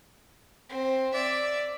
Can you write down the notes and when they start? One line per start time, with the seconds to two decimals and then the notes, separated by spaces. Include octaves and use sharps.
0.69 C4
1.14 D5 E5